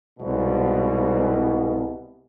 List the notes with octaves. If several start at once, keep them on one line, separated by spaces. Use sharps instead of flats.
C2 G#2 B2